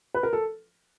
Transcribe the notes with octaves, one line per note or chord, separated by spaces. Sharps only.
B4
A#4
A4